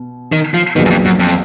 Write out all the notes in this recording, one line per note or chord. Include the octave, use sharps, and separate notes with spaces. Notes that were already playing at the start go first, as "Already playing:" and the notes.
Already playing: B2
D#3
F3
A#1 A#2 D#3 F#3 B3
F#2
F2
F#2
F2